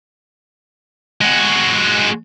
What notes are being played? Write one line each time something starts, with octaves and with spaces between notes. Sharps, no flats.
G#3 F#4